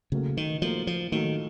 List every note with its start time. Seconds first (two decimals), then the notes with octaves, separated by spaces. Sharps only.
0.12 A2 C#3 F#3 A#3
0.37 D#3
0.62 A2 F3 F#3 A#3
0.87 F3
1.12 A2 D#3 F#3 A#3